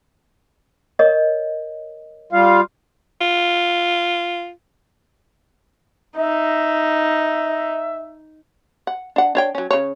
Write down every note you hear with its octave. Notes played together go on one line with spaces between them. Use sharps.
A#4 C#5 D#5
G3 F4 F5
F4
D#4 E5
F#5
D4 F#5
D4 C#5 G5
F#3 C#4
C#3 C#5